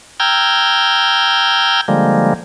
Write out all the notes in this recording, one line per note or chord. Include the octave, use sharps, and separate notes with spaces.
G5 A#5 E6 F6 G6 G#6
D3 F3 G3 G#3 A#3